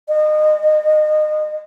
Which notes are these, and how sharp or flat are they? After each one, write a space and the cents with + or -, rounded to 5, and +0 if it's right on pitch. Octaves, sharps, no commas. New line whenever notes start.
D#5 -30